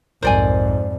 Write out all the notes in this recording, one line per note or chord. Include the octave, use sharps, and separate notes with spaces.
B1 F2 G#2 A#4 C5 D5 G#5